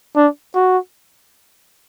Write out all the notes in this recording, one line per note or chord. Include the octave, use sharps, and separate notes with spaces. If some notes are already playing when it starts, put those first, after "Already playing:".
D4
F#4